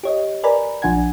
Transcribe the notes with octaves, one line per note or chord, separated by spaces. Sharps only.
G4 C#5 D#5
A#4 B4 D5 G#5 A#5 B5
A#1 F3 D4 F#5 G#5 G#6